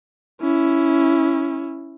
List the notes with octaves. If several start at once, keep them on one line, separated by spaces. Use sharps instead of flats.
C#4 E4